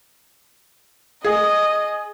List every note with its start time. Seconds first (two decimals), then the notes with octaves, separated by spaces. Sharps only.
1.24 G#4 D#5